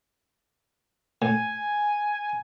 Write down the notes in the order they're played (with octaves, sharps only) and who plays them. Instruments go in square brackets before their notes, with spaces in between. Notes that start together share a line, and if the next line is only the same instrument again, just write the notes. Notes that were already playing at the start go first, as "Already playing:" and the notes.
[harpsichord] A2 [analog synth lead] G#5